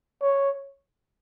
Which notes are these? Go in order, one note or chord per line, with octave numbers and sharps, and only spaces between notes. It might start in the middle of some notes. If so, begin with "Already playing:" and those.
C#5